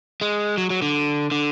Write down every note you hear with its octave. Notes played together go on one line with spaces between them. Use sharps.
G#3
F#3
F#3
D3
D3